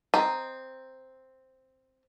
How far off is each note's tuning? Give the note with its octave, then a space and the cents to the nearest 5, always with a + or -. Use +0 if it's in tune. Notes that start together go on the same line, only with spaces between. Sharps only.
C4 +0 D#5 +0 A#5 +0